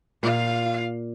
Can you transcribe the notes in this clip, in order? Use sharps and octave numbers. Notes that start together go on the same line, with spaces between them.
A#2 F4 F5